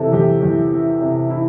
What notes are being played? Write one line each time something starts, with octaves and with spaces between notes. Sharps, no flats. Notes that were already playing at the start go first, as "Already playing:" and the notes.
Already playing: C3 E3 A4
E2 G4
E2
E3
C3
E3 E4